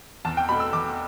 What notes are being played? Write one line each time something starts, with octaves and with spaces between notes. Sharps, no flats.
E2 A5
G5
B2 A3 B5
E6
E2 D6